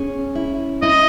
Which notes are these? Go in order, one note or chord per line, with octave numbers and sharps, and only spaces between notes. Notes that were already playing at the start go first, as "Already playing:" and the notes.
Already playing: C#4 G#4
E4
E4 D#5